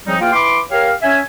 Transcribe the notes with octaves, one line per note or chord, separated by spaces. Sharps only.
C#3 F3 G3 C4 D#4
E2 A#3 F4 F5 G5 F6
E3 B5 C6 D6
G4 A#4 C#5 F5
C#4 E5 G#5